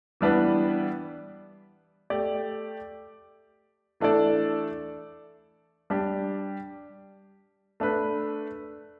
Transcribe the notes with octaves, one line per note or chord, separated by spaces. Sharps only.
E3 G3 B3 D4 B4
A3 G4 D5
E3 A3 D4 A4 D5
G3 D4 G4
A3 D4 B4